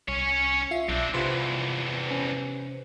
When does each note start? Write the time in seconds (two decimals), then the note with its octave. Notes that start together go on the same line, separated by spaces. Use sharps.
0.08 C2 C#4 C#5
0.71 F4 E5 C7
0.89 B1 C4 D4
1.14 E2 G2 C3 F4 B4 C5
2.11 C#4